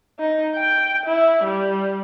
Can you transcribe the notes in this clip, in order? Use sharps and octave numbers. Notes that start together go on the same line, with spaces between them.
D#4
G5
E4
G3